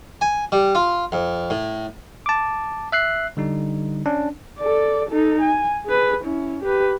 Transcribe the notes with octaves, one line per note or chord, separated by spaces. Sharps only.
G#5
G3
F4
F2
A2
A5 D6
E5 F#6 C7
D3 G3 D#4
C#4 D4
A4 D5
D#4 A4
G#5
G#4 B4
C#4 E4
G4 B4